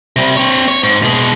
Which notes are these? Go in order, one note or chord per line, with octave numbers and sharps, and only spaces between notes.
C3 G3
C4 C#5
C#5
G#2
B2 G#3